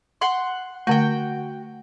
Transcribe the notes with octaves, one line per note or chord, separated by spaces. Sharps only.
F#5 C6
D3 A3 F#4 G5